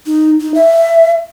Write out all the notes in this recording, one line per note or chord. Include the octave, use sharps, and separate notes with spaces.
D#4
D#4
E5